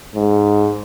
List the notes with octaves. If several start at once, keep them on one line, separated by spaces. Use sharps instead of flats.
G#2